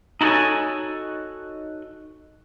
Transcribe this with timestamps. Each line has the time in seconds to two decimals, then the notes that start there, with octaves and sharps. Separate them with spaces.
0.21 D#4 E4 F#4 A4 C#5 G#5